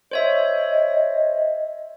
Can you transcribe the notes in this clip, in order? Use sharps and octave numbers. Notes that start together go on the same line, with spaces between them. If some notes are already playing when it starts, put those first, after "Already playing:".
C5 C#5 D#5 E5